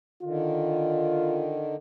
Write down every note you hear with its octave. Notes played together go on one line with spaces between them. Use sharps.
D3 D#3 F4